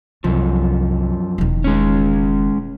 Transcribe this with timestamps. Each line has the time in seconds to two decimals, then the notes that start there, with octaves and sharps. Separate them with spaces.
0.24 C2 F#2 F3
1.38 E1 D#3
1.64 G#3 C#4